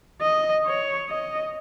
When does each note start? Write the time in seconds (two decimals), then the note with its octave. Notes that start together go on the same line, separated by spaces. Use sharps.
0.21 D#5
0.65 C#5
1.09 D#5